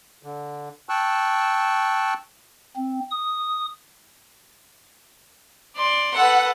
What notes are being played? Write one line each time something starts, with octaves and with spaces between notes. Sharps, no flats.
D3
G5 A5 C#6 E6 F#6
C4
D#6
D5 C6
A4 B4 F#5